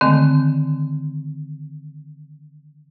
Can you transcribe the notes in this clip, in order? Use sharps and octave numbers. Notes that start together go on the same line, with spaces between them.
D3 D#3 G#3 A3 C4